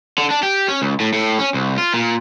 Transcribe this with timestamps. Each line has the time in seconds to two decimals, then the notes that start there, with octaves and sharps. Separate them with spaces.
0.18 D3
0.30 D4
0.43 G4
0.68 C#4
0.82 C#2
1.00 A2
1.13 A2
1.39 C#4
1.54 C2
1.78 F4
1.94 A#2